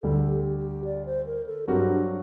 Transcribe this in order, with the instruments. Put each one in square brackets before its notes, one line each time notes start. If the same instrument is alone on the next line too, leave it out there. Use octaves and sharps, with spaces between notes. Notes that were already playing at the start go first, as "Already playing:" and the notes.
[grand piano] D2 D3 G3 [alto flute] A4
[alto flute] G4
G4
D5
C5
A#4
A4
[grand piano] G2 F#3 C4 F#4 A#4 [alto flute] G4
[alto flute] D4